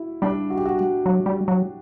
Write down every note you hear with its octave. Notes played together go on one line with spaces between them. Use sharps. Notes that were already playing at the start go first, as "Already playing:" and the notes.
Already playing: E4 F#4
G3 D4
F#4
G4
F#4
F#4
F#3
G3
F#3